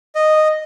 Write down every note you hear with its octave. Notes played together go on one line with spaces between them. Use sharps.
D#5